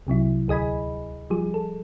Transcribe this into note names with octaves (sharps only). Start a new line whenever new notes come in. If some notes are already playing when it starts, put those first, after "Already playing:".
C2 C3 F#3 E4
D2 G#4 D#5 G#5 B5
F3 G3 G#4
A4